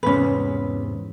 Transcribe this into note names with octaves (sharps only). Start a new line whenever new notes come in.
E2 G#2 C3 C#4 B4